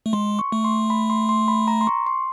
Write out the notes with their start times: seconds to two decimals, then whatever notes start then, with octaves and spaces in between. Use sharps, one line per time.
0.06 A3
0.13 G#3 C6
0.39 C#6
0.52 A3
0.64 C6
0.90 B5
1.10 C6
1.29 C6
1.48 B5
1.68 A#5
1.81 C6
1.87 C#6
2.06 C6